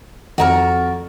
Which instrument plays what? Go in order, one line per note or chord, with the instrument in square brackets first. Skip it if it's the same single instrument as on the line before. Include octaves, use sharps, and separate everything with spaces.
[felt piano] F2 A#5 F6 [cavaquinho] F#4 C#5 D5